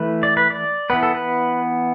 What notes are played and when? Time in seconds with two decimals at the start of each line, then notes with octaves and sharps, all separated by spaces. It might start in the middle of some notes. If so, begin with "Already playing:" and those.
Already playing: E3 A3 B4
0.23 D5
0.37 B4
0.50 D5
0.90 E3 B3 B4
1.03 A4
1.15 B4